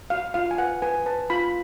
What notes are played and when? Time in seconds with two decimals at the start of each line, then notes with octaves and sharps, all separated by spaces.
0.10 F#4 F5
0.34 F4 F5
0.51 G#5
0.58 B4 F#5
0.82 B4 G#5
1.06 B4 A5
1.30 F4 B5